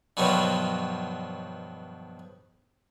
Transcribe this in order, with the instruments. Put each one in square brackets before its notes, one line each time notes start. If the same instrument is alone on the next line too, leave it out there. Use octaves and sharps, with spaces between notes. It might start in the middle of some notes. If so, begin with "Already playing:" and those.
[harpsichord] G2 B2 D#3 F3 F#3